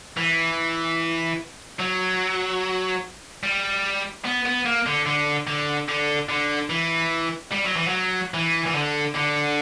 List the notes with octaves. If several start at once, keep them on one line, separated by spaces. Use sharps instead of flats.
E3
F#3
G3
B3
B3
A#3
D3
D3
D3
D3
D3
E3
G3
F#3
E3
F#3
E3
E3
D3
D3